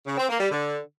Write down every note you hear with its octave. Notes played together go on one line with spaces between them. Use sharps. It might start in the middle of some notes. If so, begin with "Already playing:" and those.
C#3
C4
A#3
G3
D3